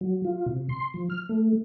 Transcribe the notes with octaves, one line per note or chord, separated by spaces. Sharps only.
F#3
F4
C3
C6
F3
F6
A3